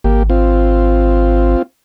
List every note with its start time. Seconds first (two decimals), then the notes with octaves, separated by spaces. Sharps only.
0.04 G#1 A#3 G4
0.30 C4 F4